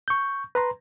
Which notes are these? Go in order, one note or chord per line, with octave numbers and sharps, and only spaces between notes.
C#6 G6
B4 A#5 C6